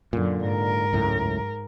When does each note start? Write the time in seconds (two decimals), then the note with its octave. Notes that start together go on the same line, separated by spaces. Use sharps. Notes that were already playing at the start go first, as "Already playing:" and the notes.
0.13 F#2 A#2 D3
0.46 G#2 A#4
0.93 C#2 F#2 A2